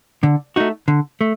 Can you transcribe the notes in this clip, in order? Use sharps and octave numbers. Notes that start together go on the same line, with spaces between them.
D3
A3 D#4 F#4
D3
A3